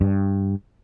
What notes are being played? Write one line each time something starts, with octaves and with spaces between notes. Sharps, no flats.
G2